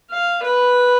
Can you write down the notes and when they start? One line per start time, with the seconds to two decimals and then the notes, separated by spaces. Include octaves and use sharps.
0.11 F5
0.43 B4